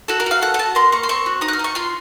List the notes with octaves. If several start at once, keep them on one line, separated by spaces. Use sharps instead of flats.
F#4 A4
A#4
F#4 F5
A4 F#5
F#5
F#4 A5
A#3 C6
A#3 C#6
C6
C4 C#6
F#4
D#4 D#6
F#6
F6
D#4 C#6
F4 C6